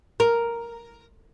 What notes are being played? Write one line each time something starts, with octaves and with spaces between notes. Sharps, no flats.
A#4